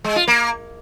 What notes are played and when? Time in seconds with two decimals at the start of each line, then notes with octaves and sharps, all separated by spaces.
0.04 G#3
0.16 F4
0.28 A#3